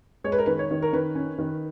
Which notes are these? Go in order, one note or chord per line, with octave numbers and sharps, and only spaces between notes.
G#3 C#5
B4
A#4
D#3 B4
C#5
D#3
A#4
D#3 B4
C#4
D#3